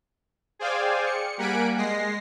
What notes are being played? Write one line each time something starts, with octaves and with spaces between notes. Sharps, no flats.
G#4 C5 D5 F5 G5 G#5
C#7
G3 A#3 F#5 G#5 B6 D7
G#3 A#6 C7